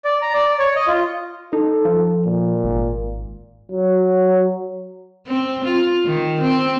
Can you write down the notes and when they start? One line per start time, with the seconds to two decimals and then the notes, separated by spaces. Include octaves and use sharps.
0.05 D5
0.22 A#5
0.33 D5
0.59 C#5
0.76 D#5
0.87 F4
1.53 D#4 A4
1.85 F3
2.25 A#2
2.64 G#1
3.71 F#3
5.27 C4
5.65 F4
6.06 D#3
6.41 C4